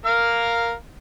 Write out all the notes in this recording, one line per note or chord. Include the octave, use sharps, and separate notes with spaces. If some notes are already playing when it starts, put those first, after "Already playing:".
A#4 F5 F6